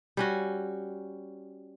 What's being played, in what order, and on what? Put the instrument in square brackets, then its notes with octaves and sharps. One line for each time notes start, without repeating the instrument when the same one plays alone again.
[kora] G3 C#4 F#4